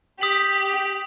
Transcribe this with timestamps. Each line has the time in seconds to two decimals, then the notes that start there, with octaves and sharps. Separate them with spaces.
0.21 G4 D#6 B6 F#7